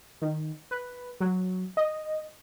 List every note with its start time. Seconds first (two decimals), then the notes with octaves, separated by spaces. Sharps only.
0.22 D#3
0.71 B4
1.21 F#3
1.77 D#5